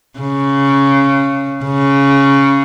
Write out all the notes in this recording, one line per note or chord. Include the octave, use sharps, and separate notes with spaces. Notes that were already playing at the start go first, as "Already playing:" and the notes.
C#3
C#3